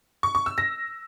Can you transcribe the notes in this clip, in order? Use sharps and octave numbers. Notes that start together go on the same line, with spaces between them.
C#6
C#6
E6
A#6